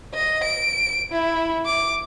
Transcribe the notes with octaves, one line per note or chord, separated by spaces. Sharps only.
D#5
D7
E4
D6